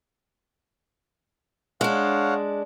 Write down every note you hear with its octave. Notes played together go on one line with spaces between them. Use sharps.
G#3 D4 C#5 F5 F#5